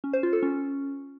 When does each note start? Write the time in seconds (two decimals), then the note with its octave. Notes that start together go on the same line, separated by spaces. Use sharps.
0.04 C#4
0.13 C5
0.23 F4
0.33 A4
0.43 C#4